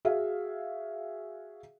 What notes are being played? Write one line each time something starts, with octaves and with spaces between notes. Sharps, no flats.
F#4 G#4 E5 F5